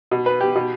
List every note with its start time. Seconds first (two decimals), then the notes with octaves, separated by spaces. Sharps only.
0.11 B2
0.26 B4
0.41 G4
0.55 B2